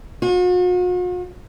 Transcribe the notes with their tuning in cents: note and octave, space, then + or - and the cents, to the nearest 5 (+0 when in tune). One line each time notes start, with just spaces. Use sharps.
F#4 -45